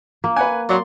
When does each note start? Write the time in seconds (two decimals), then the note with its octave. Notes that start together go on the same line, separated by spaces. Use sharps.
0.24 A#3
0.36 B4 F#5 G#5
0.69 F#3 D5 C6